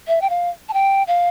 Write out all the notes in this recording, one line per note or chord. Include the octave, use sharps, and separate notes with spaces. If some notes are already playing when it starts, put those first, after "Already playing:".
E5
G5
F5
A5
G5
F5